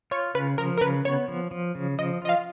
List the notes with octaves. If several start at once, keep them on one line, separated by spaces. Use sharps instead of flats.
F4 C#5
C#3 B4
F3 A#4
A#4
C#3 B4
B3 C#5
F3
F3
C#3
F3 D#5
F4 D#5
F5